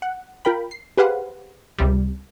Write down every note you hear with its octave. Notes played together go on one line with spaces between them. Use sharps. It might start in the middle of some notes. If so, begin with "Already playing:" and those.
F#5
F4 A#4 G5 B5
C7
G4 G#4 B4 C5 F5 F#5
C#2 C3 G3